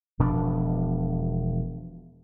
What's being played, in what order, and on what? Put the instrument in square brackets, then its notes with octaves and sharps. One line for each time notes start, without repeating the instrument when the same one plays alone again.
[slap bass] E1 B2 F3 D4